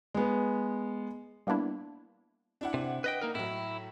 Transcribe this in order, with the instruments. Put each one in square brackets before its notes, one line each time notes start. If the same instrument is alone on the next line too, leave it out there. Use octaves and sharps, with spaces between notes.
[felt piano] G#3 B3
[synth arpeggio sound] G3 A#3 B3 D4 E4
[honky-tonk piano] D4 E4 F#5
[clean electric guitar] C3
B4 D#5 G5
A#3 D#4 A#4
[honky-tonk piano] A2 F#3 [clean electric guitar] E4